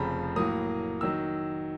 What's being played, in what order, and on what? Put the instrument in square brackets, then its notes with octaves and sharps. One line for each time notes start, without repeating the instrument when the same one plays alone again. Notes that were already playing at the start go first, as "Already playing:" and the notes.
Already playing: [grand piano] F1 F2 C#3 F3 A#5 B5
A2 F#3 A#3 D#6
D#3 F#3 E6